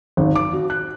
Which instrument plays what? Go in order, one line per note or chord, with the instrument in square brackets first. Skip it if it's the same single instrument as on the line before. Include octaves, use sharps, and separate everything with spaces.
[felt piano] G#1
D6
F#4
F#6